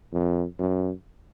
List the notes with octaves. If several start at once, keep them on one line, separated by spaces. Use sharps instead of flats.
F2
F#2